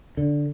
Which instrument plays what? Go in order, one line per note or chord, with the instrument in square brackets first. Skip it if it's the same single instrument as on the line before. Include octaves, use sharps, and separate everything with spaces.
[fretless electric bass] D3